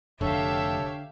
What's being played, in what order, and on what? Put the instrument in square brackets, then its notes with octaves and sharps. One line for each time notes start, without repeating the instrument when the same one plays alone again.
[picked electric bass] F1 [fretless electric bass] D3 [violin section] G4 E5 F5 [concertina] A4 C#5